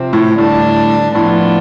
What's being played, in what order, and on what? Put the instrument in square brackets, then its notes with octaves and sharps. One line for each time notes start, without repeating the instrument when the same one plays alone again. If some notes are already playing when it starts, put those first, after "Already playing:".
Already playing: [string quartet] C3 F3 C4
[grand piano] A2
[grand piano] A2 [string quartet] D3 G3 D4
[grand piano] A2 [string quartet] F3 B3 D4 F4